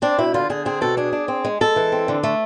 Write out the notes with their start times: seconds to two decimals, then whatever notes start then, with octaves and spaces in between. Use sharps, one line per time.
0.02 C4 D4
0.18 B2 E4
0.34 D3 F4
0.50 D3 G#4
0.65 C4 G#4
0.81 B2 A4
0.97 D4 G#4
1.13 D4
1.28 C4
1.44 G#3
1.61 G#3 A4
1.76 E3
1.92 C4
2.08 D3
2.23 A3